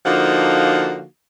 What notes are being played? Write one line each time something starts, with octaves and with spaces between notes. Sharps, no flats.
D3 F3 A#3 D#4 F#4